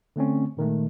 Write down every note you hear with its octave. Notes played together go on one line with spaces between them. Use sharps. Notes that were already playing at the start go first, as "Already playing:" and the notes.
D3 A3 C4 C#4
A#2 D#3 G#3 A3